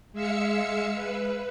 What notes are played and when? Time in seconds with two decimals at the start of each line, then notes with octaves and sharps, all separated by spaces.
0.13 G#3 E5 F5 E6 C#7
0.95 B4